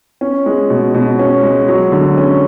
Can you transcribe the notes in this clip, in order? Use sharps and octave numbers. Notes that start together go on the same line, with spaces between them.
C#4
G#3
B2
B2
C#4
G#3
F#3
D3
C#4